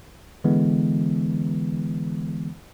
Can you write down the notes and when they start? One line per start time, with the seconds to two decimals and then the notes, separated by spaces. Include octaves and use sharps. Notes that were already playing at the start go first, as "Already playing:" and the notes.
0.44 D3 E3 G#3 B3